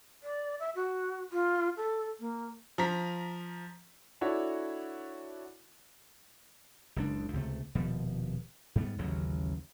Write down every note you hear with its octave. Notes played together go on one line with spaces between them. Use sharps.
D5
E5
F#4
F4
A4
A#3
F3 A#5 B6
D4 E4 F#4 A4 C#5
F#1 C#2 D4
C#2 C3 A3
D#1 B2 F3
G#2 G3 B3
A1 D#2 C#3 F#3